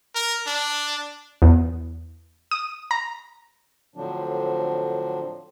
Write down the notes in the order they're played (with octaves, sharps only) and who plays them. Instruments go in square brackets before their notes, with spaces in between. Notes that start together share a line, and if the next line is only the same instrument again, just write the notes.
[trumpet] A#4
D4
[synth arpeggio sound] E2
D#6
A#5
[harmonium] A2 D3 F3 F#3 C4 D4